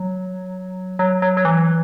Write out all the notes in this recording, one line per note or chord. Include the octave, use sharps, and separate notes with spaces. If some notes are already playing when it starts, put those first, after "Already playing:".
Already playing: F#3
F#3
F#3
F#3
E3